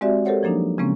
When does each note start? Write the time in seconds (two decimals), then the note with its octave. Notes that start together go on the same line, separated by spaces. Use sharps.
0.01 G#3 C4 F#4 G4 D5 E5
0.25 G4 A4 A#4 C5 C#5 F#5
0.43 F3 F#3 A#3 D4 D#4
0.78 C#3 F3 G#3 A#3 C4 C#4